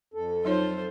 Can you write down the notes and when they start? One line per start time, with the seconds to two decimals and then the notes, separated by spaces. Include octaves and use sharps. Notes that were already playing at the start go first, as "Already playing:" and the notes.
0.14 F2 A4
0.45 F#3 D#4 F4 C5 C#5